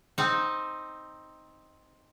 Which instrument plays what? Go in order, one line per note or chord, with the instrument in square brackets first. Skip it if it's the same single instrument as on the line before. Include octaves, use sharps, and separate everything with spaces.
[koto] C4 D#4